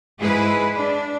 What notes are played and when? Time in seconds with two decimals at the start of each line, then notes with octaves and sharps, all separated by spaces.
0.21 G#2 G#3 E4 G#4 B4
0.76 D4